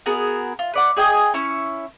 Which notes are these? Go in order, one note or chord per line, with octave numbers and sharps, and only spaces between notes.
B3 F#4 G#4 A#4
F4
B4 D5 F#5
G#4 D#5 G5 G#5
C#4 E4 C#6